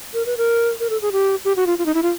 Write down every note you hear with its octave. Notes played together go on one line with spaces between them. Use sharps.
A#4
B4
A#4
A#4
A4
G#4
G4
G4
F#4
F4
F4
D#4
E4
F4